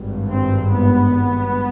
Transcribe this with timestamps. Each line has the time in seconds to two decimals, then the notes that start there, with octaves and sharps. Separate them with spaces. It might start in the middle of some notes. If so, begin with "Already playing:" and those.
Already playing: G#1 G2
0.30 C4
0.74 B3